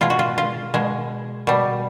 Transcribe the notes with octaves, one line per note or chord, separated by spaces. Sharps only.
B2 G#3 F4
F#4
F4
F4
B2 G#3
B2 G3